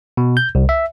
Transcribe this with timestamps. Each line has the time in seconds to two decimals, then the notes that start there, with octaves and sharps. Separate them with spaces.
0.17 B2
0.37 G6
0.55 C2
0.69 E5